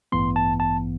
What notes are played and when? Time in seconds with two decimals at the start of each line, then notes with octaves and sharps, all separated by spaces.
0.12 A1 G2 E3 B3 C6
0.36 A5
0.60 A5